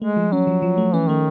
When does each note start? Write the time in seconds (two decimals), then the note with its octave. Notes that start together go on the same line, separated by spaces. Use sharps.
0.01 G#3 A3
0.17 F3
0.32 F#3 C#4
0.47 F3
0.62 F3
0.78 A3
0.93 E3 C#4
1.09 D#3 A3